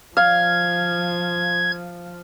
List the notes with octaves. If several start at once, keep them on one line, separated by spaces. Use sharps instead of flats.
F3 F5 G#6